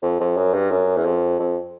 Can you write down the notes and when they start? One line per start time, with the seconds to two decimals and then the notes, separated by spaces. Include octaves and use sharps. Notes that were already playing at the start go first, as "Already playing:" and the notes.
0.02 F2
0.20 F2
0.37 F#2
0.54 G2
0.71 F#2
0.97 E2
1.05 F2
1.40 F2